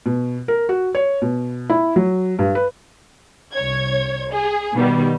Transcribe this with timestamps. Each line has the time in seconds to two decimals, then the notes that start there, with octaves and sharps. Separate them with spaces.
0.06 B2
0.48 A#4
0.69 F#4
0.95 C#5
1.22 B2
1.70 E4
1.96 F#3
2.39 G2
2.55 B4
3.53 C2 C#5 G#6
4.32 G#4
4.75 B2 D#3 G3 B3